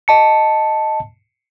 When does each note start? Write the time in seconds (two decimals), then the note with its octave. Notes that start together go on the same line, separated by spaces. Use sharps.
0.08 D#5 A5 C#7